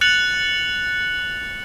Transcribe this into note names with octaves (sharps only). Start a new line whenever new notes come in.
F#6 A6 C#7 F7 F#7